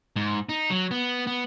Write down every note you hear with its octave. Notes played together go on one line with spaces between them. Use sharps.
G#2
D#4
F#3
B3
B3